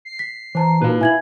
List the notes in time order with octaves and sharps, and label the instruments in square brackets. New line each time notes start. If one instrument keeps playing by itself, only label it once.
[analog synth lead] C7
[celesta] B6
[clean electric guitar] E3 [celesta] C5 A5 A#5
[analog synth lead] A#2 [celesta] D#4 F#4 [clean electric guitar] B4 F5
[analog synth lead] E4 [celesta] G#5 G#6 F#7